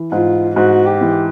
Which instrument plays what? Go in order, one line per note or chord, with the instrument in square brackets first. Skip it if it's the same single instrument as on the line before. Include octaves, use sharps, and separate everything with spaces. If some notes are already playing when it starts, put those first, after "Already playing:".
Already playing: [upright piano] E3
[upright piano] G#2 [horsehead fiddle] F4
[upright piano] G#2 [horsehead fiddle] F#4
[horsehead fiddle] G4
[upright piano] E3